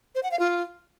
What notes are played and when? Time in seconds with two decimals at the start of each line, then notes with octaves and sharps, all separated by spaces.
0.15 C5
0.23 F#5
0.31 F5
0.39 F4